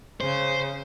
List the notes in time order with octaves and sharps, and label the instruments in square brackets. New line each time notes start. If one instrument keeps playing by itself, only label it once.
[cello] C#3 [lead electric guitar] C5